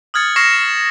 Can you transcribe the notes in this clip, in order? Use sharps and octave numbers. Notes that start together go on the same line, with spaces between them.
D#6 F6 G#6 A6 C#7
C#6 F6 A#6 C7 C#7 E7